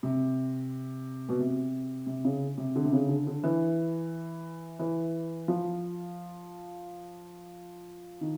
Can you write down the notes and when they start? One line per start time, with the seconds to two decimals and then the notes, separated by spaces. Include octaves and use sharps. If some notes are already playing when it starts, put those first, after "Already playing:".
0.03 C3
1.29 B2
1.39 C3
2.07 C3
2.25 C#3
2.58 C3
2.76 D3
2.85 C3
2.93 C#3
3.09 D3
3.27 D3
3.44 E3
4.79 E3
5.48 F3
8.21 D#3